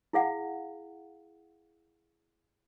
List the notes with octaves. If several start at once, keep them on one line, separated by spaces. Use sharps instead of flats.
E4 G#4 F5 F#5